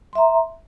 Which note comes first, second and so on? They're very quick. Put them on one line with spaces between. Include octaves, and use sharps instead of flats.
C6 E5 A#5